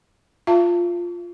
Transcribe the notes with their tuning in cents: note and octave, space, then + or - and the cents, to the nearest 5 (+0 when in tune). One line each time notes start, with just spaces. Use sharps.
F4 +0 F5 -45 A5 +30